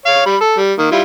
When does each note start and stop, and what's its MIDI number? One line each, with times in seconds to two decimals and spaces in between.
0.06 0.24 73
0.06 0.24 77
0.26 0.37 55
0.26 0.37 83
0.40 0.56 69
0.57 0.73 55
0.78 0.88 51
0.78 0.88 58
0.91 1.02 55
0.91 1.02 64
0.91 1.02 65